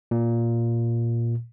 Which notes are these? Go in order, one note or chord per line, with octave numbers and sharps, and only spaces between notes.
A#2